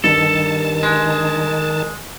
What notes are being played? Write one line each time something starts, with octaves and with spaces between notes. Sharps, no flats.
G2 D#3 A4 A5
G#3